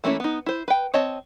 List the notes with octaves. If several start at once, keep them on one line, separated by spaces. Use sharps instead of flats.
E3 A3 A#3 C#4 E4
B3 D#4
E4 C5
B4 G5
C4 C#5 D#5 A5